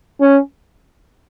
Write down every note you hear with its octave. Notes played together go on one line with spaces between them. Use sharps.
C#4